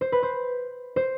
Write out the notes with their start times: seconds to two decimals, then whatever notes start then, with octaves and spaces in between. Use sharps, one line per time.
0.01 C5
0.12 B4
0.23 C5
0.96 C5